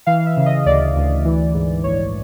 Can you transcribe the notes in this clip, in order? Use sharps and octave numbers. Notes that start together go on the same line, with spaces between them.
E3 F5
E5
C#3
D#5
D2 D5
D2
E3
G#2
A#1 C#5